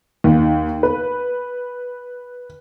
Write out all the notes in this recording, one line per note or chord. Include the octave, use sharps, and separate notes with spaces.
D#2
B4